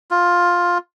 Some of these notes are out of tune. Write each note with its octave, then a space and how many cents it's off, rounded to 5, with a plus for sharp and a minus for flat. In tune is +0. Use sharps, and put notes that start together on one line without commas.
F4 +10